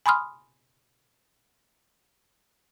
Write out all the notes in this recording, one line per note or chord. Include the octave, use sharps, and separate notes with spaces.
G#5 B5 C6 D#6 F6